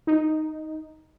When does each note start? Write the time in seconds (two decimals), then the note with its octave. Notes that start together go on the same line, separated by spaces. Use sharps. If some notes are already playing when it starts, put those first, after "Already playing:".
0.07 D#4